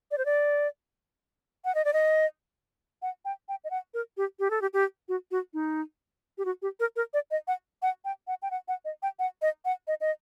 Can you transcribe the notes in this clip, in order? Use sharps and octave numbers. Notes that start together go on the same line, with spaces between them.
D5
C5
D5
F#5
D#5
D5
D#5
F#5
G5
G5
D#5
F#5
A#4
G4
G4
A4
G4
G4
F#4
F#4
D#4
G4
F#4
G4
A#4
A#4
D5
D#5
F#5
F#5
G5
F#5
G5
F#5
F#5
D#5
G5
F#5
D#5
F#5
D#5
D#5